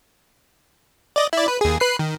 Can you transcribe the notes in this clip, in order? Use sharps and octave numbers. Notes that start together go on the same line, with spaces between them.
D5 D#5
E4 D5
B4
D#2 G#4
B4 F#6 C7
D#3